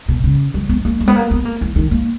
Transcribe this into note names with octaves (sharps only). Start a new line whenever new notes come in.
B2
C#3
F#3
B3
A#3
G#3
B3
A#3
B3
A#3
E3
D#3
A#3